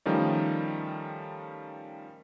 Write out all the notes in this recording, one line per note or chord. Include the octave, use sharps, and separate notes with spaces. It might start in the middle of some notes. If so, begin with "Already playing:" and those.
D#3 F3 G3 A3 C#4 D#4